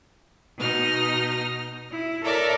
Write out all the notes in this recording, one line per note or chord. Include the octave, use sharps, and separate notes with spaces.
B2 D#4 F6 A#6
E4
A4 A#4 C#5 D5 E5 A#5